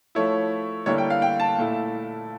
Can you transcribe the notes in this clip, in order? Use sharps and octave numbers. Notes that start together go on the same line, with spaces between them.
F3 A3 E4 C#5
D3 G3 A#3 E4 C#5
G5
F5
G5
A5
A#2 A3 E4